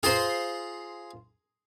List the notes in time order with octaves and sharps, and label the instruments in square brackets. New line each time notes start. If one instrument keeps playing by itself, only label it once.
[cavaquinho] F4 C5 [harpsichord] G#4 A#5 C6